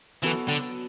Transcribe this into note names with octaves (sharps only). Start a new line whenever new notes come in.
E3 F#3 B3 F#4 A4
D3